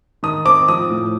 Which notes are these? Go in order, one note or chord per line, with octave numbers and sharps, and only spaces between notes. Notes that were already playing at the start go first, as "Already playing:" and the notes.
D#3 D#6
C4 D6
F3 D#6
A2